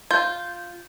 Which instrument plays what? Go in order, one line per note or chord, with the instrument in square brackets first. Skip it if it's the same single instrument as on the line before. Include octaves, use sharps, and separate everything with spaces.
[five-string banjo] F4 [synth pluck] G6